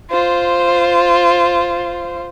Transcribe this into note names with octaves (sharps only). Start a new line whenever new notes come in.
F4 C5